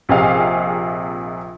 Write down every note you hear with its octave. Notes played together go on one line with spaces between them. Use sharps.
A#1 C3 G#4 D#5 F5